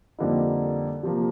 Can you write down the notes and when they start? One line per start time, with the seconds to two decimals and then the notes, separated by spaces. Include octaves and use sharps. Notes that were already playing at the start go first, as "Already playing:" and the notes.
0.19 F2 D3 G3 A#3 D#4
1.03 C3 F3 A#3